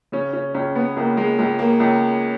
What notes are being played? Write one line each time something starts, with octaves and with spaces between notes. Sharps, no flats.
C#3 C#4
C#4
C#2 C#4
B3
C#2 A#3
G#3
C#2 G#3
A#3
C#2